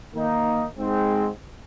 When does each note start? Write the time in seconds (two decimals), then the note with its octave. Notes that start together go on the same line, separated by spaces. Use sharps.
0.15 D#3 A#3 D#4
0.77 G#2 G#3 C4